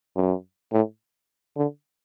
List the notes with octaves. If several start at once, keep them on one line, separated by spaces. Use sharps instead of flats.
F#2
A2
D3